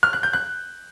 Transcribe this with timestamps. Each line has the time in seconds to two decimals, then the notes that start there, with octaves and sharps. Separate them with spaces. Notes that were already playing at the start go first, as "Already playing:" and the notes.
0.03 F6
0.13 F#6
0.23 G6
0.33 F#6